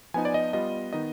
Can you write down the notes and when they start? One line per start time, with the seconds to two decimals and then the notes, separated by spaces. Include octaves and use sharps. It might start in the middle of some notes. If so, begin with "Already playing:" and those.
0.14 F3 B3 D#4 G#5
0.25 D5
0.34 D#5
0.53 G3 B3 F4 D#5
0.93 D#3 B3 D#4 D#5